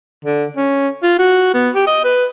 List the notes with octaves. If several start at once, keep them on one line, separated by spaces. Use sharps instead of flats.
D3
C#4
F4
F#4
B3
G4
D#5
B4